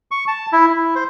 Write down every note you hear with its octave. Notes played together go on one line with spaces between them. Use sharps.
C#6
A5
E4
E4
C5